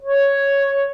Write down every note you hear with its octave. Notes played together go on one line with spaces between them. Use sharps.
C#5